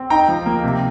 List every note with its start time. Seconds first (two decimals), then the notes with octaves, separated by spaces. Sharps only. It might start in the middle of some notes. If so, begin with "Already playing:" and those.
Already playing: C4
0.10 D#4 G5 A#5
0.28 F3
0.46 A#3
0.64 C3